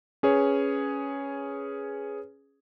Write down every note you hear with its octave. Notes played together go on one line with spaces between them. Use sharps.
C#4 G#4 B4 C#5